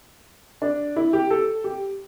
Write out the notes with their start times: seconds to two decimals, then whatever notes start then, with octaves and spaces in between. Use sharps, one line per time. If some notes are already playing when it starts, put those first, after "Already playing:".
0.62 D4
0.96 E4
1.13 G4
1.31 A4
1.64 G4